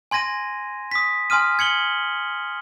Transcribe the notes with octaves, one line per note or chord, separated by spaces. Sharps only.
G#5 C6 G#6 A#6 D#7
D#6 B6
G#5 C6 D#6 F6 D#7
G#6 C#7 F#7 G7